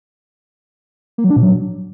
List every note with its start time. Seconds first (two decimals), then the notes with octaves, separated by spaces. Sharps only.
1.18 A#3
1.24 F#3
1.30 D4
1.36 A#2
1.43 F#3